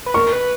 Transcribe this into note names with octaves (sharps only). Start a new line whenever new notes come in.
B4
A#4 C#6
B4